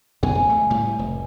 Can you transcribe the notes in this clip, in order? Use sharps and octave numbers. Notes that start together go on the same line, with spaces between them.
F#2 B2 D3 G#5
E1
A3
A2 G3
F1